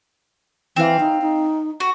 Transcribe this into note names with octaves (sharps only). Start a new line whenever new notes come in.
E3 C4 F5
D#4
D#4
F#4